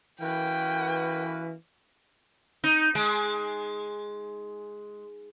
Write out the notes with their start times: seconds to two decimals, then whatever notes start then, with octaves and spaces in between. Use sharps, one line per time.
0.21 F#2 E3 A#3 B4 G5
2.64 D#4
2.95 G#3